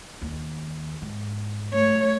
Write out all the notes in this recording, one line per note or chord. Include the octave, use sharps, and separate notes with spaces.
D#2
G#2
A3 C#5